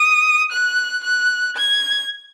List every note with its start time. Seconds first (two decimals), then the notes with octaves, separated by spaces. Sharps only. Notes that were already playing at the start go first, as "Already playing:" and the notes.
Already playing: D#6
0.52 F#6
1.04 F#6
1.56 G#6